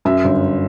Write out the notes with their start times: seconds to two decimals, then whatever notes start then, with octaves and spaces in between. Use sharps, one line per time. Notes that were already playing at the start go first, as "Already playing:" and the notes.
0.05 F#2 E5
0.24 G1